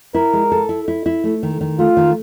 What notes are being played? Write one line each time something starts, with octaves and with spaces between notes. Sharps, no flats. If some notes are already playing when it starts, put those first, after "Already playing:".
E4 A#4
G#3
A4
E4
E4
E4
A3
D#3
D#3
A3 F4
D#3